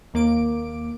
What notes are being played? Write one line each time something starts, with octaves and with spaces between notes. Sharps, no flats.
D#2 A#3 D6 D7